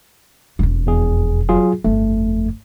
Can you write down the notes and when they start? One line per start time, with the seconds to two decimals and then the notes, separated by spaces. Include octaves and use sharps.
0.59 E1 F2
0.87 E2 G#4
1.49 F#3 F4 G#4
1.85 G1 F2 A3